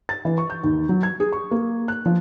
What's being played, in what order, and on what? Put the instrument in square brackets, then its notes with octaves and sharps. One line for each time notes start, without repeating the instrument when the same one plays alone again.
[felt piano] A6
E3
C#6
G6
D#2
F#3
G#6
G#4
C#6
A#3
F#6
F3